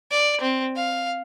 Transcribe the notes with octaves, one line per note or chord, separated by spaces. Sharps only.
D5
C4
F5